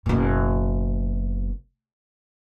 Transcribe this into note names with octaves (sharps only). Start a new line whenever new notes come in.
F#1 B2